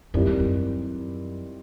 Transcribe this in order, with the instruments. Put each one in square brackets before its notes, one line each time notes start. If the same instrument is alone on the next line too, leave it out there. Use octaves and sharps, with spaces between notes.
[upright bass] F#2 [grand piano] D#3 G3 C4 E4 G4
[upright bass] E2
F#2